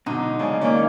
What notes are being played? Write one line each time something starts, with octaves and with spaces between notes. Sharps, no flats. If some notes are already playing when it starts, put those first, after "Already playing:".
B2 D3 F#3 D#4
C#3 G#3 D5 G#5
D#3 A#3 C#4 D5